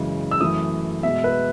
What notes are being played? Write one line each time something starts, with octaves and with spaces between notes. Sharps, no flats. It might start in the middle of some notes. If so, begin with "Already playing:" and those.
Already playing: F#2 C#3 E3 G#3
E6
F#2 E3 A3 D#6
B2 G#3 E5
B4